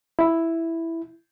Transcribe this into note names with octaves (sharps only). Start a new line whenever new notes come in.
E4